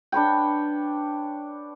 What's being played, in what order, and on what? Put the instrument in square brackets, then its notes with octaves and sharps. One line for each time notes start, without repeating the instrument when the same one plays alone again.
[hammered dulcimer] D4 B4 C#5 G5